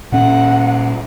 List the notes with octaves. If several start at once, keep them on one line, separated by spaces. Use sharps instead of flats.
A#2 C#4 F#5